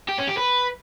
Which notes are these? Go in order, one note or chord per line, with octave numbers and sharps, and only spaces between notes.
G4
C#4
G4
B4